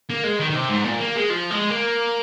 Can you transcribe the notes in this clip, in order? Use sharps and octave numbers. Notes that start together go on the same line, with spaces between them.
A#3
G#3
D#3
D#3
C3
G#2
A#2
A#3
G#3
F3
G#3
A#3